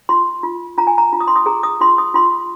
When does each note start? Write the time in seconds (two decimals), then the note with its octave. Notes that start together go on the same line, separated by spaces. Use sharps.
0.09 F4 C6
0.43 F4
0.78 F4 A#5
0.87 G#5
0.98 A#5
1.13 F4
1.20 D#6
1.28 C6
1.36 D#6
1.46 G#4 A#5
1.63 D#6
1.81 F4 C6
1.98 D#6
2.14 F4 C6